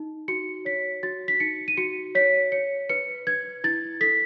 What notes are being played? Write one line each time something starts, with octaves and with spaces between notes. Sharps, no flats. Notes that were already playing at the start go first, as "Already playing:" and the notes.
Already playing: D#4
F#4 C#7
C#5 B6
F#4 A6
B6
D#4 C#7
D#7
F#4 C#7
C#5 B6
C#5 C#7
B4 C#7
B4 G#6
E4 A6
A4 B6